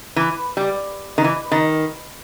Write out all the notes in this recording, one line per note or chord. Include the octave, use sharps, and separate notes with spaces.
E3
G3
D#3
E3
D#3